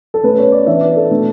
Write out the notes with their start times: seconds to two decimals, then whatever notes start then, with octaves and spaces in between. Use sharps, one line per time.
0.14 A4
0.23 B2 A3 C#4 B4
0.38 C#5
0.52 D5
0.67 E3 B3 D4 E5
0.81 D5
0.96 A4
1.10 B2 A3 D4